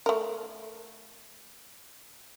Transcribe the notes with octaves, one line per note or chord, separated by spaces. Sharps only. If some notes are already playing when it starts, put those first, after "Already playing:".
A3 A#4